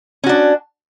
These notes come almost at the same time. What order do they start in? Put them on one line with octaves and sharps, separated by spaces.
C#4 F#4 D4